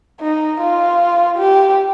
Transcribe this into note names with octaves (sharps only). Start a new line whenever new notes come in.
D#4
F4
G4